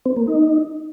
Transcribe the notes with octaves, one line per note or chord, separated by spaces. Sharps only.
C4
A#3
D#4